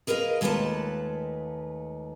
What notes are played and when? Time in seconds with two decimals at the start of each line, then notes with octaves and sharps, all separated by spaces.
0.07 G#4 A#4 B4 D#5 F5
0.41 D#2 G#3 A3 F4 B4 A5